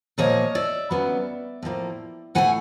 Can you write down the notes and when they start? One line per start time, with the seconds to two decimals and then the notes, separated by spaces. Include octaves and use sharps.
0.18 A#2 F3 A#3 C#5 D#5
0.55 D5 E5
0.91 C#3 F#3 B3
1.63 A2 F3 A#3
2.35 A2 F#3 A3 F#5 G#5